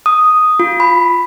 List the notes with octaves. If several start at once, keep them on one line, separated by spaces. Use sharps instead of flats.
D#6
F4
B5